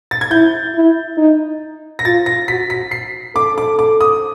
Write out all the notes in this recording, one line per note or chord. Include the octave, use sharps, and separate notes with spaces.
A6
G#6
E4 G6
E4
D#4
A#6
F4 A6
A#6
F#4 B6
B6
C7
A4 D6
D6
D6
D#6